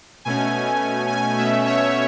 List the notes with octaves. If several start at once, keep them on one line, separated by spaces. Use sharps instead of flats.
B2 A3 C#4 G#5
G#5
B2 A3 C#4 E5
C#5